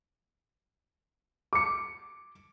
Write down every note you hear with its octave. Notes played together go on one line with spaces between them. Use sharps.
D6 C#7